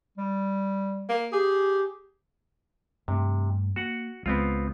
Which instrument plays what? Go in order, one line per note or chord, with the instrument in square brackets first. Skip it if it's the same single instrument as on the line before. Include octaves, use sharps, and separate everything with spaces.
[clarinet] G3
[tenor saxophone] A#3
[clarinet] G4 [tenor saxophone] G#4
[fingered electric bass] G2 A3 [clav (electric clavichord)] C3
[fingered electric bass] A#3 [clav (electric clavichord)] F#4 F#5
[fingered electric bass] C#2 G#3 [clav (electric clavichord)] B3 C4 F4